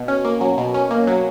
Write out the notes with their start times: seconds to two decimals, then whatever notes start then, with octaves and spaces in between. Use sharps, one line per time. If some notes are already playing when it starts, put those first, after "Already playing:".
Already playing: B2
0.08 C#4
0.25 A#3
0.41 F#3
0.58 B2
0.74 C#4
0.91 A#3
1.07 F#3